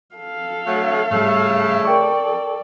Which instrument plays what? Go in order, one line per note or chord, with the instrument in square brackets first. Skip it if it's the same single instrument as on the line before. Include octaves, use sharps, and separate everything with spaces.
[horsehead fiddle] A4 F5
[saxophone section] D2 F#3 A3
[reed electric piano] G#2 G3 [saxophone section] C#3 A3
[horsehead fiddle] A4 D5 [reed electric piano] A#4 G5 C#6